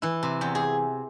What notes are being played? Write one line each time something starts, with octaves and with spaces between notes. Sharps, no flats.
E3 E4
C3
E2 G4
G#4